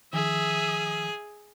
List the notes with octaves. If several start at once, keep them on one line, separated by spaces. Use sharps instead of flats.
D#3 F3 G#4 E5 D#6